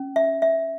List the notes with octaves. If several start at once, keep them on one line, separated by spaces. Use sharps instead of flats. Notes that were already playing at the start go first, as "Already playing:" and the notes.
Already playing: C#4
E5
E5